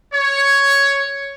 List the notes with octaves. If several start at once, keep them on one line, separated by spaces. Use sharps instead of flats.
C#5